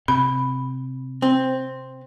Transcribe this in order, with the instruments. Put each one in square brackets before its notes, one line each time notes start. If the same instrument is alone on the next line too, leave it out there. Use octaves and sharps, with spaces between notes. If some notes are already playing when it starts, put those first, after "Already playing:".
[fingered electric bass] C3 [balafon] B5
[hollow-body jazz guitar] C4